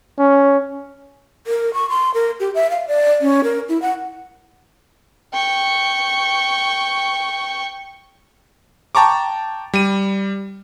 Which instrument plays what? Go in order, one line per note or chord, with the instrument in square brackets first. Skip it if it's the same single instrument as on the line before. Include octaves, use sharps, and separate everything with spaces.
[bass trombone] C#4
[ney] A#4
C#6
C6
A#4
G4
E5
F5
D5
C#4
A#4
E4
F#5
[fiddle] G5 C#6
[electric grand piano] G5 A5 A#5 C#6 D6
G3 D#7